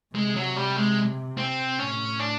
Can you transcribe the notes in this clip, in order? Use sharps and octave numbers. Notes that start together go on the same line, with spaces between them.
C3 G#3
F#3
G3
G#3
C4
A2 C#4
D4